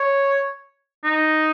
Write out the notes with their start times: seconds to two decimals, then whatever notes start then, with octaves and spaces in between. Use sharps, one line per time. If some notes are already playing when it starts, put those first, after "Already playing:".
Already playing: C#5
1.04 D#4